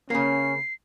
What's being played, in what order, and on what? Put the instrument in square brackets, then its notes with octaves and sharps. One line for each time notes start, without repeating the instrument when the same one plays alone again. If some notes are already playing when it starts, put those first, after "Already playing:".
[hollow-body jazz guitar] C#3 A#3 [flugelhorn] C#4 [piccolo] C7